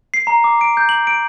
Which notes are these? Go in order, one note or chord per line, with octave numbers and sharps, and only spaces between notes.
C7
A#5
D6
D7
G6
F#7
D7